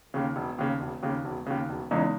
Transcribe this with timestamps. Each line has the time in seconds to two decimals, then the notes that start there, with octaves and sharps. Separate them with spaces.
0.14 D#2 C#3
0.36 E1
0.58 D#2 C#3
0.80 E1
1.03 D#2 C#3
1.25 E1
1.46 D#2 C#3
1.69 E1
1.91 E2 C#3 G#3 D#4